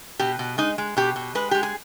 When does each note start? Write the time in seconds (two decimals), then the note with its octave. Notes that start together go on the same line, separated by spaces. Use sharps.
0.19 B2 G4
0.39 B2
0.58 G#3 D#4
0.78 G#3
0.97 B2 G4
1.16 B2
1.35 G#3 B4
1.51 G#3 G4
1.63 G#4